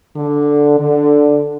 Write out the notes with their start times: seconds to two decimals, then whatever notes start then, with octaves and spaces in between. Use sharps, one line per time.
0.16 D3
0.79 D3